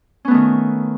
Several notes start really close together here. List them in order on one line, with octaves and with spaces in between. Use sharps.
C#4 B3 A3 D#3